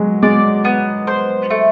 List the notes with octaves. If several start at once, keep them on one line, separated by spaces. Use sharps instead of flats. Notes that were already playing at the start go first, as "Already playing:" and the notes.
Already playing: F#3 G#3
G#3 D5
B3
C5
A3